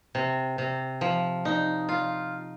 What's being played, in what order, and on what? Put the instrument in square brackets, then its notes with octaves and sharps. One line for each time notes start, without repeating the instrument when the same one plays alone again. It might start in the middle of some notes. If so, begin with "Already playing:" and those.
[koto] C3
C3
F3
D#4
F4